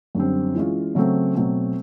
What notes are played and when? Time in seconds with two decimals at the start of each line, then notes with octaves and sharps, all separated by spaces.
0.15 F#2 D3 G3 C4
0.55 E3 G#3 C#4 F4
0.95 C#3 F#3 A3 C4
1.35 B2 F#3 A3 C4